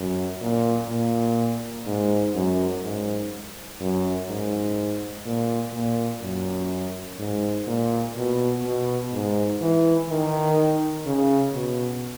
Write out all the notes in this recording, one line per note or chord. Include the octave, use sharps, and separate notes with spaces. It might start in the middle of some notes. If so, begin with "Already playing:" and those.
Already playing: F#2
A#2
A#2
G#2
F#2
G#2
F#2
G#2
A#2
A#2
F#2
G#2
A#2
B2
B2
G#2
E3
D#3
C#3
B2